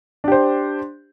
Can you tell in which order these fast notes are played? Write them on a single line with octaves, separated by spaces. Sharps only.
D4 G4 C5